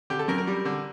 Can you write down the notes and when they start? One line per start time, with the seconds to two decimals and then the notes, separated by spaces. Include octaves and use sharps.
0.10 D3 G4
0.19 A4
0.28 F#2 A#4
0.38 A#4
0.47 G3
0.65 D3